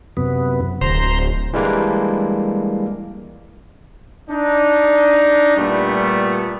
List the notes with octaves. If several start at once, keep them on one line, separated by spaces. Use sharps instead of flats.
F#2 C3 B3
D1 C5 A#5 C6
E3 G3 G#3 A#3 D4
D4 D#4
A#2 G3 A3 B3